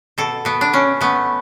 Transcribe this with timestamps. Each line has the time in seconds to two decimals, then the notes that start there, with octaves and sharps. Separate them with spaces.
0.18 B2 A4
0.45 B2 B3
0.61 D4
0.73 B2 C#4
1.01 A3 B3